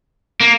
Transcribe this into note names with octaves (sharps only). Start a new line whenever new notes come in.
A#3